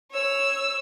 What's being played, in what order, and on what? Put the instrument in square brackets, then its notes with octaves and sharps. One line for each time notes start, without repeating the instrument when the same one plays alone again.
[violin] C#5 E6